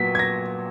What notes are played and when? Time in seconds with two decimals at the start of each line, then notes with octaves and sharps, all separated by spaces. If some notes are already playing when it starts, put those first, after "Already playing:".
Already playing: A#2 F#3 B3 B6
0.15 G#6
0.19 A#6